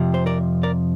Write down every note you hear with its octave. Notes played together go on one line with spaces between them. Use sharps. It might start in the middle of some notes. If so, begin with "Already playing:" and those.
Already playing: F2 C3 F3
C5
A#4 D5
A#4 D5